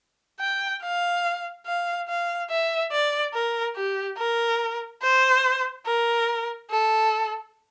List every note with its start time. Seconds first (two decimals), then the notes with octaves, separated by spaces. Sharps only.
0.40 G5
0.82 F5
1.66 F5
2.08 F5
2.51 E5
2.92 D5
3.34 A#4
3.76 G4
4.18 A#4
5.02 C5
5.87 A#4
6.70 A4